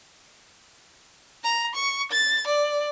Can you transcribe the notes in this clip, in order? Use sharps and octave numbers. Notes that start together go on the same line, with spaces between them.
A#5
C#6
A6
D5